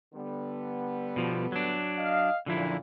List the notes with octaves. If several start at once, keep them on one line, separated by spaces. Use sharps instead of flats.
D3 G3 B3
B2 F3
F#3 D4
D#5 F5
C#2 F#2 A#2 D3 F3 E4